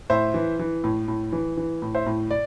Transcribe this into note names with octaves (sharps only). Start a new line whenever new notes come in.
A2 C5 E5
E3
E3
A2
A2
E3
E3
A2
C5 E5
A2
D5